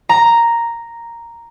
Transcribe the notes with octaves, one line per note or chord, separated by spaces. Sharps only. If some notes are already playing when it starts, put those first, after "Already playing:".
A#5